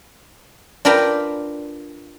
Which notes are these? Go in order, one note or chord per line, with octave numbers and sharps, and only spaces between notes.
D4 F4 A#4 B4 G5 A#5